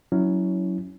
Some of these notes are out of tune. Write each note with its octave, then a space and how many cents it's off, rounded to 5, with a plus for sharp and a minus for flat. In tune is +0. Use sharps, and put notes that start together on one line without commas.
F#3 +0 C#4 +10 E4 -15